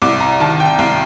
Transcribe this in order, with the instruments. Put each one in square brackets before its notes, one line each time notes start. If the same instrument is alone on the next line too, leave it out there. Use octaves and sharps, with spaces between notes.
[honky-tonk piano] C2 D6
A#5
D#3 A5
G5
C2 F5